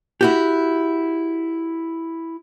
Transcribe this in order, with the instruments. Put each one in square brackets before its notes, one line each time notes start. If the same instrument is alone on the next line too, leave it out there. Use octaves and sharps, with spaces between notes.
[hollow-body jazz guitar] E4 F#4 G4